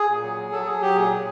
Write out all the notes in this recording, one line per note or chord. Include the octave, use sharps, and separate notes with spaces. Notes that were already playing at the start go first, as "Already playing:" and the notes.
Already playing: G#4
A#2
F#3
F#3
F#3 A4
F#3 G#4
F#3 G4
A#2 G#4
A#2